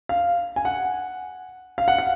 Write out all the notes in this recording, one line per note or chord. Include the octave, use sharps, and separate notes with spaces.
F5
G#5
F#5
F5
F#5
F5